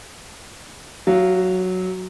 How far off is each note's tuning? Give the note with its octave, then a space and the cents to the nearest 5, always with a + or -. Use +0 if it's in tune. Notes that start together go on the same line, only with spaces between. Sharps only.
F#3 +0 F5 -25